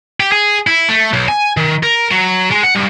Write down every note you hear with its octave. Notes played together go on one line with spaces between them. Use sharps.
G4
G#4
E4
A3
B1
G#5
D#3
A#4
F#3
G#3
F#5
G2